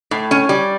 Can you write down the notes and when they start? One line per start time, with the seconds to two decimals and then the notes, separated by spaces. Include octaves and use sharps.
0.11 A2
0.31 C#4
0.49 G3